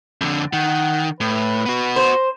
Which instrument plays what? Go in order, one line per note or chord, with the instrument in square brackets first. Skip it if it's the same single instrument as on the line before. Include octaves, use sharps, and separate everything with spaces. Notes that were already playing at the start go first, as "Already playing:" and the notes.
[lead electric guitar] F2 D3
[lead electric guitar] D#3 [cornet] F#5
[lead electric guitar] A2 [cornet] B4
[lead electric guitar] B3 F#4
[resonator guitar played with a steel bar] C5